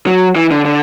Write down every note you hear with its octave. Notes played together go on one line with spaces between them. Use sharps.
F#3
E3
D3
D3